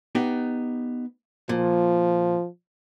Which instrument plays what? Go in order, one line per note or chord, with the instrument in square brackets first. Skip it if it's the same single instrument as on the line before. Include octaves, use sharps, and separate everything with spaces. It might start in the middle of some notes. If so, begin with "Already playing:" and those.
[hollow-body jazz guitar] B3 D#4 G4
[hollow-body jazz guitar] A#2 [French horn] F3